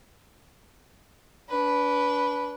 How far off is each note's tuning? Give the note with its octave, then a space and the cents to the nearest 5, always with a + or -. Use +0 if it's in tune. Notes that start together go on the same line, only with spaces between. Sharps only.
D4 -35 B4 -5